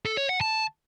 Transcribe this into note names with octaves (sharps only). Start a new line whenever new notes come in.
A4
C#5
F#5
A5